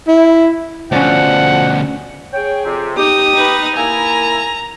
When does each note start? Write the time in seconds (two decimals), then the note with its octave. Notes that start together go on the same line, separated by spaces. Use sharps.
0.08 E4
0.92 D2 B2 F3 C#4 D5 F#5
2.33 G#4 C#5 G5
2.65 F2 C3
2.97 D#4 G4 D#6
3.34 D#4 B4
3.76 A#3 E4 G#5 A#5